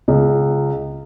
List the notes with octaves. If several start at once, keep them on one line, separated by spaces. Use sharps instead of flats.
C#2